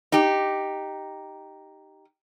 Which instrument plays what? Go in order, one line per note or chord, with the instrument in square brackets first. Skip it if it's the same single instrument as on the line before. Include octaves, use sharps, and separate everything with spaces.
[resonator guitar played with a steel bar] D#4 G4